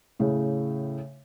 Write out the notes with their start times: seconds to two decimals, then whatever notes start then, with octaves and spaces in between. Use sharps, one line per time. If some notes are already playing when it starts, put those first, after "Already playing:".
0.20 A2 C#3